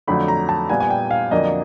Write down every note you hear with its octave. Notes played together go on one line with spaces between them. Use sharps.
F2 D3 F#3 A3 B5
A#5
A5
A#2 G3 B3 G#5
G#5
G5
F5
F2 D3 F#3 A#3 D4 D#5